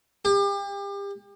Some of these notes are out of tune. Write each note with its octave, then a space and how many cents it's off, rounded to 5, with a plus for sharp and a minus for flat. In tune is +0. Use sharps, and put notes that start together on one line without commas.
G4 +35